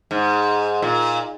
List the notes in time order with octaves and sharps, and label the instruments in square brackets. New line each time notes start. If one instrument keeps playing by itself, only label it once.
[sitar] G#2
A#2